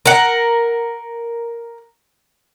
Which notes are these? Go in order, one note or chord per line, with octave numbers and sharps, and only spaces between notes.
A#4 F#5